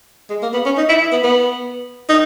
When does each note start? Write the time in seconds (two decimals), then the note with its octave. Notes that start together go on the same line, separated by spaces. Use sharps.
0.30 G#3
0.42 A#3
0.54 B3
0.66 C#4
0.78 D#4
0.89 E4
1.01 E4
1.12 B3
1.23 B3
2.09 D#4